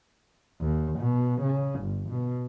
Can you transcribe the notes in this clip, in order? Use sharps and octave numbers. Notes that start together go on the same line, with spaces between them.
D#2
B2
C#3
G1
B2